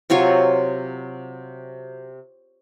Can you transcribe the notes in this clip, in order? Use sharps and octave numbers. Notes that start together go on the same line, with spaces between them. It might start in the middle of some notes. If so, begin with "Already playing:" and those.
C3 F#3 F4 C#5